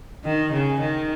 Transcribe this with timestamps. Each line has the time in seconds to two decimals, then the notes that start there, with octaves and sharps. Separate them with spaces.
0.25 D#3
0.52 C#3
0.80 D#3